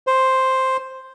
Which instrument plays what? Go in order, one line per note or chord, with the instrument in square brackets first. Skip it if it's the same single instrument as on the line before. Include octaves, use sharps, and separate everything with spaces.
[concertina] C5